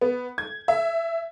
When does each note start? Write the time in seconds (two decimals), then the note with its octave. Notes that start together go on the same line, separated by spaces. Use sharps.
0.01 B3
0.38 G#6
0.68 E5